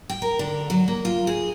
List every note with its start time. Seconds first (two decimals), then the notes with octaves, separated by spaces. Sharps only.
0.09 G5
0.22 A#4
0.39 D3
0.70 F#3
0.88 A#3
1.05 F4
1.27 G#4